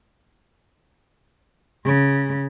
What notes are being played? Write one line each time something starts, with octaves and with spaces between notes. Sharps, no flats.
C#3